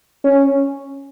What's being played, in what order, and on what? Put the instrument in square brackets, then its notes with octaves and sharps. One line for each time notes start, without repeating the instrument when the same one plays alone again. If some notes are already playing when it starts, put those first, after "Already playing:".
[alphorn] C#4